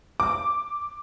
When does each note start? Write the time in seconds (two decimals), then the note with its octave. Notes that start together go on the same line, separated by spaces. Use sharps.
0.20 D6